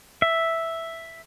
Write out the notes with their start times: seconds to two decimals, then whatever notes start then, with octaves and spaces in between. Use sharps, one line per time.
0.22 E5